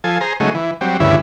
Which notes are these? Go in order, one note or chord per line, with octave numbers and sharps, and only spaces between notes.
F3 A4 G#5
G#4 C5 A#5
C#3 F#3 G#3 A3 D#4
E3
F#3 G3 C4
D2 G2 C#3 E3 E4